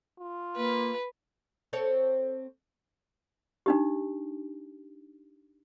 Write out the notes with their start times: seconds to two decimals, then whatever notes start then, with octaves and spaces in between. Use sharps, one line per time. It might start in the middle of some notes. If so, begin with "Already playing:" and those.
0.20 F4
0.57 A#3 B4
1.73 C4 A4 C#5
3.66 D4 D#4 G4